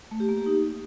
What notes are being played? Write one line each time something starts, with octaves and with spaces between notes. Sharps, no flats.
A3
G4
A#3
G4
D#4